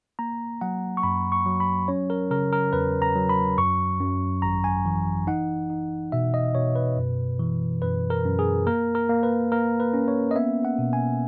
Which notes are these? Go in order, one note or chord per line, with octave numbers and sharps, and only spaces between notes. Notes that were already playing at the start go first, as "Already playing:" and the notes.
A#3 A#5
F#3 F#5
C#6
F#2 B5
C#6
F#3
B5
C#4 C#5
A#4
C#3 A#4
A#4
E2 B4
A#5
F#3
B5
F#2 C#6
F#2
G#1 A#5
G#5
E3
D#4 F#5
D#4
B2 E5
D#5
B2 C#5
B4
F#2
E3
F#2 B4
A#4
F#2
G#4
A#3 A#4
A#4
A#3
B4
A#3 A#4
B4
C#4
C#5
D#5
B3 E5
F#5
B2
G#5